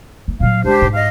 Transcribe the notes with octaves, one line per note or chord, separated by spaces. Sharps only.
A#3
A#2 F#3 F5
C#2 D4 G4 C5
G#2
D#5 F5